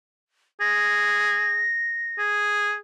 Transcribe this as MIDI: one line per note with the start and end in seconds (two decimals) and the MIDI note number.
0.60 1.66 68
0.60 2.19 94
2.19 2.75 68